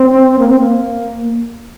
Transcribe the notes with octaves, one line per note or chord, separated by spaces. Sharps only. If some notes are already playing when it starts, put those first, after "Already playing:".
Already playing: C4
A#3
C4
A#3